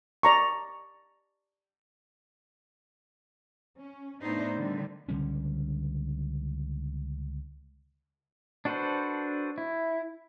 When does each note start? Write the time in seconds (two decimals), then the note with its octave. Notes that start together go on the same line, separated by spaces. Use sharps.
0.23 D5 A#5 C#6
3.79 C#4
4.21 A2 A3 B3 D4 D#4 C5
4.56 D3 D#3 G3
5.09 C#2 D3 G3 C#4
8.65 D4 F#4 A4 B4 C5
9.58 E4